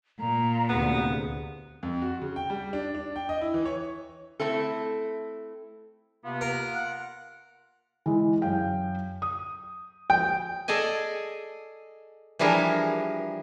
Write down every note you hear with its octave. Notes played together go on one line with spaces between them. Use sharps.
A#2 A#5
D2 C3 B3 G#4
F2
F#4
C#3
G5
G3
D4
D4
G5
D#5
E4
E3
C#5
A3 C4 E4 A4
C3 A#3 B3 F4
A#4
F#5
E3 G#3
F#2 F5 G5
D#6
G5
G#4 A4 D5 D#5 G#5
E3 F3 G3 D4 G#4 A#4